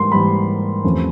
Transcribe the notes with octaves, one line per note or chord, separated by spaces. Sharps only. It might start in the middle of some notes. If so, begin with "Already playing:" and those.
Already playing: G#2 E3 G3 A#3 C6
G#2 E3 G3 A#3 B5
E2 C3 F3 A3 C#4